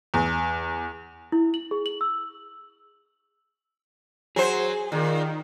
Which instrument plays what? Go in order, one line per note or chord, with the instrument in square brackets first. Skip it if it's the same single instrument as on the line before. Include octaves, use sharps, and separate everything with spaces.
[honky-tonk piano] E2
[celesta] E4
F#7
G#4
F#7
E6
[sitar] F#3 C5 [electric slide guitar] G#4
[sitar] A#2 [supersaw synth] D#3